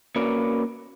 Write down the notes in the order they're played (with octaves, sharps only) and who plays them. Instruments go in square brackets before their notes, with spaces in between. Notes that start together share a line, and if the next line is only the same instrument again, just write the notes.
[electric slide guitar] A#3 C#4 F#4 A#4 B4 D5